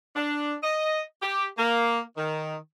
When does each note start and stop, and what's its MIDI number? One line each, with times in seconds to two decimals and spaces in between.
0.16 0.55 62
0.63 1.02 75
1.23 1.46 67
1.58 1.99 58
2.17 2.55 51